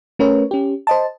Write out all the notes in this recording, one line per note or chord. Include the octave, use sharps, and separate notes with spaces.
A3 C#4 A#4 B4 C#5
C#4 G4
C5 D#5 A5